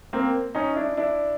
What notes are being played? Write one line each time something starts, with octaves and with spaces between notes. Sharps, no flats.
A#3 C4
C#4 D#4
D4 E4
D4 E4